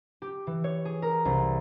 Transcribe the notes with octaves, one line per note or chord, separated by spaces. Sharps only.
G4
E3
C#5
G#4
A#4
C2